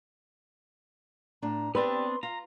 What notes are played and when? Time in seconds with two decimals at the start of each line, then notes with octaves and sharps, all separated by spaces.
1.42 A2 D4 A#5
1.75 B3 C4 D4 G4 B4 D5 G5 C6
2.23 F4 A#5